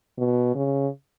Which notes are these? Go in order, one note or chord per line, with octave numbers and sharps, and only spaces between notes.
B2
C#3